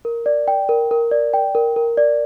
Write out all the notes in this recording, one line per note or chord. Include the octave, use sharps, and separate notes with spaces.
A#4
D5
G5
A#4
A#4
D5
G5
A#4
A#4
D5